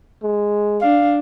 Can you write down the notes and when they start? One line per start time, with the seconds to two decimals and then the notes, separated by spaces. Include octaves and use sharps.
0.23 G#3
0.81 D4 F5